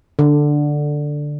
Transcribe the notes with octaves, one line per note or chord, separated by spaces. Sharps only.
D3